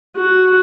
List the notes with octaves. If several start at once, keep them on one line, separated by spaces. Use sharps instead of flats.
F#4